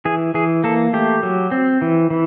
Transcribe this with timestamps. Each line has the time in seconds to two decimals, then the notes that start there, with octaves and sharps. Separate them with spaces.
0.05 E3 G#4
0.34 E3 G#4
0.64 A#3 A4
0.93 A3 G4
1.23 F#3
1.51 C4
1.82 E3
2.10 E3